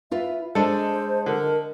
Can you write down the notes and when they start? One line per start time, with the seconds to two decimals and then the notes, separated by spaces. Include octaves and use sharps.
0.11 E4 F4 B4 E5
0.55 G#3 D4 A4 C5 D#5 A5
1.26 D3 A#4